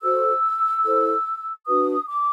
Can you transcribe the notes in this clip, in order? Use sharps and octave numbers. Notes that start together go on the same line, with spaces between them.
F#4 A4 C5 E6
E4 A4 C5
D4 F#4 B4 D#6
D6